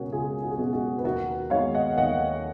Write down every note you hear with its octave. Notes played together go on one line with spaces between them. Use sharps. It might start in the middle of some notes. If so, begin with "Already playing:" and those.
Already playing: C#2 B2 G#3 C#4 F#4 G#4 A#4 C#5
C#2 F4 G#4
F#4
G#4
B2 G#3 C#4 F#4
F#4
B4
D#2 F#4 A#4
D#3 G#3 B3 C#5 F5
D#5 F#5
D#2 D#5 F#5